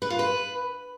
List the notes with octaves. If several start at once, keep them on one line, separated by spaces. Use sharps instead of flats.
B4
F4
B4